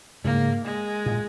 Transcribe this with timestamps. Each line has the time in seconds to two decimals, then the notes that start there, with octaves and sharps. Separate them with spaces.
0.24 G#2 C#3 A#3
0.65 G#3
1.06 A#2